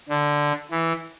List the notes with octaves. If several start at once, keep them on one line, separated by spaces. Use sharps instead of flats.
D3
E3